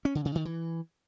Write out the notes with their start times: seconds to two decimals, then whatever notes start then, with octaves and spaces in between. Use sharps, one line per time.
0.05 C#4
0.15 D3
0.25 C#3
0.35 D#3
0.45 E3